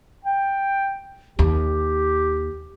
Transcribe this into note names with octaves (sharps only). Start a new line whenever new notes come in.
G5
D#2 G4